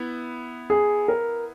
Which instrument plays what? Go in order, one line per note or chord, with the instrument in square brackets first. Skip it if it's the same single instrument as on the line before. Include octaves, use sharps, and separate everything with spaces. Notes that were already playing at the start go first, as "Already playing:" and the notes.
Already playing: [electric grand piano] B3 E4
[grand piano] G#4
A#4